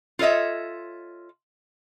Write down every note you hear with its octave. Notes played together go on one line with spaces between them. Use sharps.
F4 A4 C#5 D#5 E5